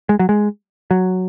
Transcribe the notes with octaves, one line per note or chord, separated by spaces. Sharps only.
G#3
F#3
G#3
F#3